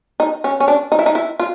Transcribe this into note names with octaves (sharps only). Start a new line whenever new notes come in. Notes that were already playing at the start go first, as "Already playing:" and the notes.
D#4
C#4
C#4
D4
D#4
E4
D#4
E4
F4